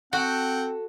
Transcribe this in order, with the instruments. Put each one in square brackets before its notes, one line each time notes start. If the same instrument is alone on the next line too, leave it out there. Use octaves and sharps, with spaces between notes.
[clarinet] C4 [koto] F#4 [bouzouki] A4 [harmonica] F#5 G5